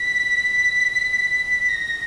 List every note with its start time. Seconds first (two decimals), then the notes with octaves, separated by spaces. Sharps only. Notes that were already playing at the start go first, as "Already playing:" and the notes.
Already playing: B6
1.69 A#6